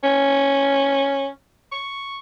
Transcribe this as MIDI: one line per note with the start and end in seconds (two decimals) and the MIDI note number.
0.04 1.28 61
1.72 2.17 85